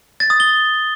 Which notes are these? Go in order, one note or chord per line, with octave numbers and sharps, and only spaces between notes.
A6
D#6
G7